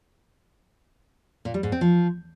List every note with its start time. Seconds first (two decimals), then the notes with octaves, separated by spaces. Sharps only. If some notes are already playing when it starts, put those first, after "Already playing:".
1.45 A#2
1.54 G3
1.63 G#2
1.72 C4
1.81 F3